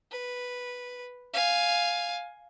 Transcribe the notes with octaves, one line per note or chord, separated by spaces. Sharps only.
B4
F5 G#5